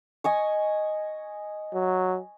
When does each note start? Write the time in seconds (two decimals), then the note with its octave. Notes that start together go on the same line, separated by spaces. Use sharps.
0.24 D#5 G#5 C#6
1.74 F#3